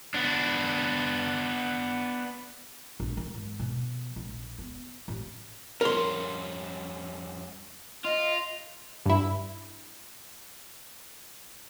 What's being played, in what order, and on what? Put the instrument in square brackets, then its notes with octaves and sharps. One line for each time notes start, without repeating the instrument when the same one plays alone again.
[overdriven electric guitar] B3 D4
[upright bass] A#1
D#3
G#2
B2
A#1
B3
A1
[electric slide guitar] F2 G3 C#4 [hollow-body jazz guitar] A#4 C6
[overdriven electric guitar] F4 [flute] D#5
[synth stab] G2 E4